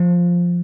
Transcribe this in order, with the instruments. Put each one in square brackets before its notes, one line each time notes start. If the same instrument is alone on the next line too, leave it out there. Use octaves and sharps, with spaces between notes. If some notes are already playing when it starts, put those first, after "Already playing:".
Already playing: [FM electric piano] F3